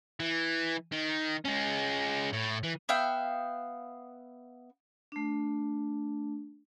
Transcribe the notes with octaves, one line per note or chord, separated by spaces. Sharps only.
E3
D#3
G#3 C#4
A2
E3
B3 E5 F5 G5
A3 D4